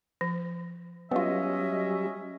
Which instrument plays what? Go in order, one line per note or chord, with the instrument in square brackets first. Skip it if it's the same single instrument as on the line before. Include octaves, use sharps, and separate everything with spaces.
[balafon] F3
[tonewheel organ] F#3 G3 [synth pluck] B3 F4 [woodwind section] C#4 D#5 E5